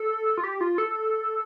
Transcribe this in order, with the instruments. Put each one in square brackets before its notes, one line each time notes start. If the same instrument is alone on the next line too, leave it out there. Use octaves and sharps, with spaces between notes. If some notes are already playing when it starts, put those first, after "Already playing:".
Already playing: [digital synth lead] A4
F4
G4
F4
A4